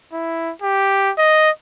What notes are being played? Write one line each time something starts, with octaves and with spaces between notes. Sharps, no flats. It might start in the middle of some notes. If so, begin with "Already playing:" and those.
E4
G4
D#5